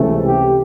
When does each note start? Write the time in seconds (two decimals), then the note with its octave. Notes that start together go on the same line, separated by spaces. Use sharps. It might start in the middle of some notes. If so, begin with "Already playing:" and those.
Already playing: C#2 C3 E3 A3
0.23 G4